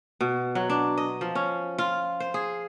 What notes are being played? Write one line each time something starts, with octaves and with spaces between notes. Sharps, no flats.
B2
F#3
D4
D#5
F3
C#4
F4
C5
G#4